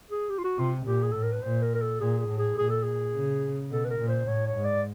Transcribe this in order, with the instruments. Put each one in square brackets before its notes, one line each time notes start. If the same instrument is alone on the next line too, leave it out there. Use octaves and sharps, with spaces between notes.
[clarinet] G#4
G4
F4
F#4
[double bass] C3 [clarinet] F4
[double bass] A#2 [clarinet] G4
[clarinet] G#4
[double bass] A2 [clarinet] A4
[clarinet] A#4
B4
[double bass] A#2 [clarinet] C5
[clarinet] A#4
A#4
A4
[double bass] A#2 [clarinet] G#4
[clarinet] G#4
[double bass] A2
[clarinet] G#4
[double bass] A#2 [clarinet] G#4
[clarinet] A4
G#4
[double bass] C#3
[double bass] B2 [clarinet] A4
[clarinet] B4
A#4
[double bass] A#2
[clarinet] C5
[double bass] A2 [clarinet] C#5
[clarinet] C#5
[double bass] G#2
[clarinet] D5